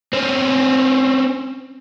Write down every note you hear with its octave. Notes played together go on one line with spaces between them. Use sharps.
C4 C#4